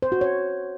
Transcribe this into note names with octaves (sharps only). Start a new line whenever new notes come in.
C5
F#4
C#5